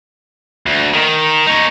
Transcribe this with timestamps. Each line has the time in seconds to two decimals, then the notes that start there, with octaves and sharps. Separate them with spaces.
0.66 D2
0.94 D#3
1.47 D#4 C#5